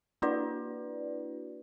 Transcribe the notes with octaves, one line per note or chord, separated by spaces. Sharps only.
A#3 D4 E4 F#4 B4 D5